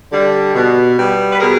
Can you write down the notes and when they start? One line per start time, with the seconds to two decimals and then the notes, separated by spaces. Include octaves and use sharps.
0.12 D3 G3
0.54 B2
0.98 G3 B3
1.33 B4
1.40 B2 G#4 A#4